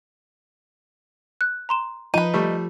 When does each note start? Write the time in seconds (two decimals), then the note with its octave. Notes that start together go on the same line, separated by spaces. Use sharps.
1.41 F#6
1.69 A#5 C6 E7
2.14 F3 D#4 F4 B4 D#7
2.34 G3 A3